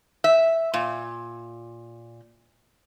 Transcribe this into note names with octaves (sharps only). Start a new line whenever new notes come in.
E5
A#2